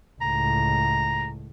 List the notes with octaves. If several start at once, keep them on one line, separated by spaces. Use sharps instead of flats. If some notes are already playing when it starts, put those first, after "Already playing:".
C#2 A2 A#5